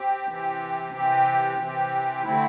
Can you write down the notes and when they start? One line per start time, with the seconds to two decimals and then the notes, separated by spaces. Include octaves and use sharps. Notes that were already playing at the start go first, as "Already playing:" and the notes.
Already playing: C4 G4
0.27 C3 E3 C4 G4
0.93 C3 E3 C4 G4
1.58 C3 E3 C4 G4
2.23 D3 A3 C4 E4